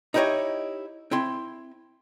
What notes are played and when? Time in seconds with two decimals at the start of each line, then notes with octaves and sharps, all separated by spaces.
0.14 D#4 E4 G4 A4 C#5 D#5
1.11 C4 E4 C6